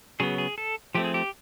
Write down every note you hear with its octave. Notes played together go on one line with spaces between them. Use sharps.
C#3 F#3 B3 G#4
G#4
A4
F3 A3 C4 G4
G#4
G4